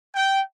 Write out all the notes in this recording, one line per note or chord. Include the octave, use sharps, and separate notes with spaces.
G5